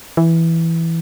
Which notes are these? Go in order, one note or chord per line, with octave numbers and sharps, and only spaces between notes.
E3